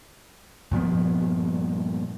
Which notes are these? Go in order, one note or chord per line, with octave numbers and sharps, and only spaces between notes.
G2 A#2 F3 B3